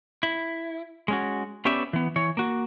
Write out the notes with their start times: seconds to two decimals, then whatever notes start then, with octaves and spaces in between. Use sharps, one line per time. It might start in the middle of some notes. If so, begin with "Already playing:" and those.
0.23 E4
1.08 G#3 C#4 F#4
1.65 B3 C#4 G4 B4 D5 E5
1.93 E3 B3
2.16 E3 C#5
2.37 A#3 F#4